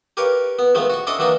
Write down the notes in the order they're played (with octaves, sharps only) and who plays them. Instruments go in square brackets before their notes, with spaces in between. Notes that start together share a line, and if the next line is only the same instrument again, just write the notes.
[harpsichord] G4 A#4 B4 C#5 F5
B3
D#3 F3 G#3 A3 B3
F#4 C#6
C#4 D4 E4 A4 D#5
D#3 E3 F#3 A#3 D4 D#4